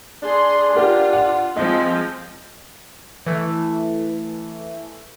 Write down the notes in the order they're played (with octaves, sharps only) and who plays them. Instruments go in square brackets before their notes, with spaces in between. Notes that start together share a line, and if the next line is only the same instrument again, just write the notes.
[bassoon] D4 [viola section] G#4 C6
[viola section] F4 [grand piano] G4 A#4 F#5
[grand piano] F#5
[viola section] F3 G#3 C4 [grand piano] D#5
[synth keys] E3 A3